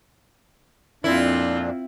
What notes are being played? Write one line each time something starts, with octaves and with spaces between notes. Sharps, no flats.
F2 A#2 C4 D4 E4 F4